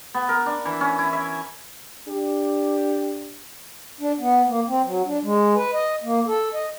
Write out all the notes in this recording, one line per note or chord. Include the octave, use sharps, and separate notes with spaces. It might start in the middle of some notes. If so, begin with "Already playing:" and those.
B3
A#4
D4
E3
C#4
E4
E5
D4 G4
D4
B3
A#3
C4
F#3
D4
G#3
B4
D#5
A#3
A4
D#5